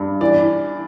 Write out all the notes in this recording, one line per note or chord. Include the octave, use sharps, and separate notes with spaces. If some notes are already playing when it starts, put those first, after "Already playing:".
Already playing: G2
E3 D5